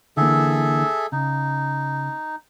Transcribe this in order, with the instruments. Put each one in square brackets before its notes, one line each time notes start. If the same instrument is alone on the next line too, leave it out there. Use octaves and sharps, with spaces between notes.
[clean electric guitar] D3 E3 A#3 [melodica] G#4 A4 E5
[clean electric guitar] C#3 [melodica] D#4